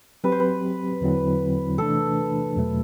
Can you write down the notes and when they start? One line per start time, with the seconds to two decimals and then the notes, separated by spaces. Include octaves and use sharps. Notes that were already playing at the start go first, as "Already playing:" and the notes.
0.24 F#3 C4 G4 B4
0.32 C5
0.40 B4
1.01 E2 D3 F#3 C4 E4
1.78 C3 E3 A3 D4 A4
2.55 E2 B2 F#3 A3